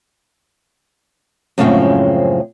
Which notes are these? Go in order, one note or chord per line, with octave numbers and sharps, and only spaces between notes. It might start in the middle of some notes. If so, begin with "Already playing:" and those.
F#2 A2 C#3 F3 G#3 C4